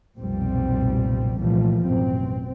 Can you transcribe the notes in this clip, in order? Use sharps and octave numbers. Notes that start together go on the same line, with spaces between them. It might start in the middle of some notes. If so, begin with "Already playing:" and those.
F1 B1 A#2 G3 C4
C2 A#2 E3 F3 G3 A3
A1 F#2 B2 C4